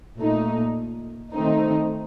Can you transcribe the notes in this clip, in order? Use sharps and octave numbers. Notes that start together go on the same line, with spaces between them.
A#2 A3 D#4
D#3 A3 C4 D#4